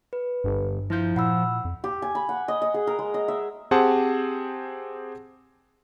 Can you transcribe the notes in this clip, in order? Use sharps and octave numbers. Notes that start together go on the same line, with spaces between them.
B4
G1 G2
F3 E4 G6
A#2 F#5 B5 E6
F2
G4
G#5
B5
F#5
D#5
D#5
G#4
A#4
G#3
D#5
E5
C4 G4 G#4 C5 F#5 A5